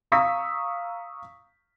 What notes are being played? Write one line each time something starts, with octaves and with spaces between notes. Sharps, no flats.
F5 A#5 C#6 D#6 E6 B6